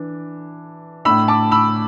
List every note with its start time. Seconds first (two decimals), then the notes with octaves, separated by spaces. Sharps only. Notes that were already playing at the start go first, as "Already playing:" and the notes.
Already playing: E3 D4
1.05 A2 A3 D4 B5 E6
1.28 A5 D6
1.52 B5 E6